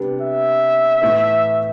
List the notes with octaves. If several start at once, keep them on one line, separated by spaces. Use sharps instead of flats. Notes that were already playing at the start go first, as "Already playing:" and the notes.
Already playing: C3 G3 B3 D4
E5
A2 E3 A3 E4